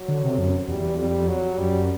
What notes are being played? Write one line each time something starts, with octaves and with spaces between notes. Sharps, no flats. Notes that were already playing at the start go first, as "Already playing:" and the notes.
Already playing: F#3
D3
C3
F#2
E2 G3
F2 G3
F#3
F#2 G3